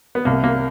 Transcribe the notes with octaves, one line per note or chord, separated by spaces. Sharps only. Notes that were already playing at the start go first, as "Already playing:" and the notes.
B3
C2 A#3
A#3